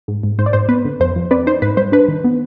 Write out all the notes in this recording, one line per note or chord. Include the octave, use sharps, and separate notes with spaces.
G#2
G#2
G#2 C5
D5
G#2 C5
B3 B4
D3
F2 C5
F3
C4 B4 D5
D#4 C5
G#2 B4
G3 C5
D4 B4
D#3
B3